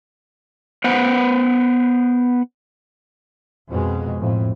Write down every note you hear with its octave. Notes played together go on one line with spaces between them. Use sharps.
B3 C5 F#5
F2 B2 G#3
F2 A2